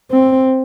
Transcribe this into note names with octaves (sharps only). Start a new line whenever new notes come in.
C4